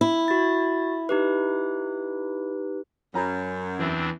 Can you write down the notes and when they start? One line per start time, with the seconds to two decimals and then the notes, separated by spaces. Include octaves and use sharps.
0.01 E4
0.28 F#4 A6
1.09 D#4 G4 B4
3.14 F#2 C#4 A#5 B5
3.78 E2 E3 C4 D4